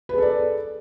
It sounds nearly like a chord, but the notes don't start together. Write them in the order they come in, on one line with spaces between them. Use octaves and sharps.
B4 G#4 A4 D5